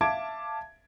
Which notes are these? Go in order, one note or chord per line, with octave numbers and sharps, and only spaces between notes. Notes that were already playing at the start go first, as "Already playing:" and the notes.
E5 F5 A5 D6 G#6 D7